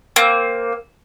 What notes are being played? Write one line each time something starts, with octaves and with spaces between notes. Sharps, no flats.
A#3 C4